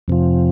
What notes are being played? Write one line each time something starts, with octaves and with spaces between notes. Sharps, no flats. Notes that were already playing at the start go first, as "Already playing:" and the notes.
F2 C3 F3